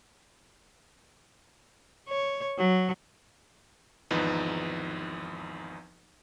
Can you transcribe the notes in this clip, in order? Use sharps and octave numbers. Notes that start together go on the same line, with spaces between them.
C#5
F#3
G#1 E2 F3 D#4 B4